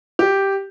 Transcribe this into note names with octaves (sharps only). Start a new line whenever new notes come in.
G4